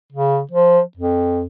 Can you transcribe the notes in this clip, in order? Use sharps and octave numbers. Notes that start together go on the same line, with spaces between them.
C#3
F3
F2